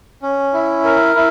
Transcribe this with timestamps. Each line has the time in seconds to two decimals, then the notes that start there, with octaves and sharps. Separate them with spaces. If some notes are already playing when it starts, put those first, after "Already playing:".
0.23 C#4
0.54 E4
0.84 A#4
1.15 E4